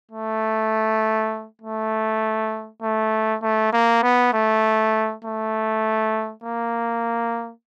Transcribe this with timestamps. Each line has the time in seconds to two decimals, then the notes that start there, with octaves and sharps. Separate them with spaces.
0.11 A3
1.62 A3
2.82 A3
3.42 A3
3.73 A#3
4.03 B3
4.34 A3
5.24 A3
6.44 A#3